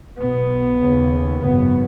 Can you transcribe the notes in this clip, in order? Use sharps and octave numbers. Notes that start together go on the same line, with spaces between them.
B1 B2 B3
D#2 C#3
G#1 F#2 C#3 B3